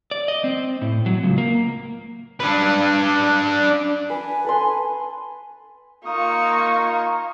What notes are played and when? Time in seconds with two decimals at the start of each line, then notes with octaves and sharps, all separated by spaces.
0.11 D5
0.28 D#5
0.44 C4
0.81 A2
1.06 F#3
1.23 C#2
1.38 A#3
2.40 D4 B4
4.10 B4 G#5
4.44 A4 B4 C6
6.05 A#3 D#4 F4 C#6 D#6